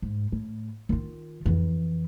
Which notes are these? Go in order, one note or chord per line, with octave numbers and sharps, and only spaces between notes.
G#2
A2
D#3 F4
F2 E3